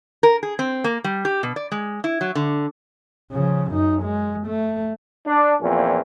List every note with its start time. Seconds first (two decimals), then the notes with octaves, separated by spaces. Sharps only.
0.23 A#4
0.43 G#4
0.59 C4
0.84 A#3
1.04 G3
1.25 G4
1.43 B2
1.56 D5
1.72 G#3
2.04 E4
2.21 F#3
2.35 D3
3.32 C#3 F3
3.71 F#2 D#4
4.03 G#3
4.47 A3
5.27 D4
5.62 E2 A#2 F3 C4 C#4